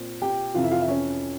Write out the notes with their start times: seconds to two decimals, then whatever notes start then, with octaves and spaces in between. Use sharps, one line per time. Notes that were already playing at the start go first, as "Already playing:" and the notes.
Already playing: A#2 C4
0.22 G4 G5
0.54 F2 C3 E3 F4 F5
0.63 E4 E5
0.71 F4 F5
0.80 E4 E5
0.88 C#4 C#5